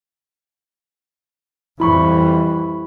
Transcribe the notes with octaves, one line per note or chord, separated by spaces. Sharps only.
F2 E3 G3 E4 B5 C#6